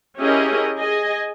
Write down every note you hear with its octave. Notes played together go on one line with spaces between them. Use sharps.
C#4 E4 G4 G#4 A#4 D#5
G#4 D#5 G#5